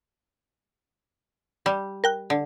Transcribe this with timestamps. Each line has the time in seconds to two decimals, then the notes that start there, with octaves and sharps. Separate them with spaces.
1.66 G3
2.04 A#4 G5 F#6
2.30 D3